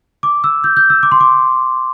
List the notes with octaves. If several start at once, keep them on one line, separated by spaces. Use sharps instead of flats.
D6
E6
G6
G6
E6
D6
C6
D6